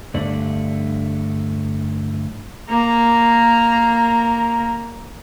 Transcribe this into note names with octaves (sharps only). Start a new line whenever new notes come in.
G2 D3 A3 D5
A#3 A#5